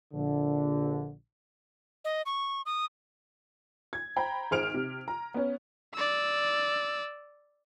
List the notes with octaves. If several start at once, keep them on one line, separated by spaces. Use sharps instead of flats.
A#1 D3
D#5
C#6
D#6
G#6
C5 G5 A#5 B5
G#1 G#4 C5 F6 D7 F7
C3
A#5
B3 C#4
D5 E6